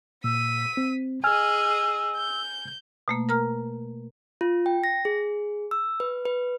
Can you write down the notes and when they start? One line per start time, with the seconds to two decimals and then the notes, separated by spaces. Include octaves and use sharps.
0.24 A#2 E6 B6 D#7
0.77 C4
1.24 G#4 D#5 G#5 E6 F6
2.16 G6
3.08 B2 A3 A#3
3.29 A#4 A#5 F6
4.41 F4
4.66 G5
4.84 A#6
5.05 G#4
5.71 E6
6.00 B4
6.25 B4